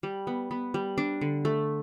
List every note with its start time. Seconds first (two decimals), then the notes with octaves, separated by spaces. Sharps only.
0.03 G3
0.27 B3
0.51 B3
0.74 G3
0.98 D4
1.21 D3
1.45 A3